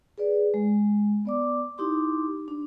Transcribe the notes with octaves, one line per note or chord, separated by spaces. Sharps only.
G#4 B4 D5
G#3
B3 D5 D6
D#4 E4 G4 C6 D6
D4